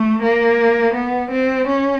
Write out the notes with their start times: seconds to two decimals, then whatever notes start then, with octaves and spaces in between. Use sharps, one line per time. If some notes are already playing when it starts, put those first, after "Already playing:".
Already playing: A3
0.22 A#3
0.94 B3
1.32 C4
1.67 C#4